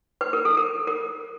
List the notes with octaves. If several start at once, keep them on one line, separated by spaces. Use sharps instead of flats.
B4
A#4
A4
A#4
A#4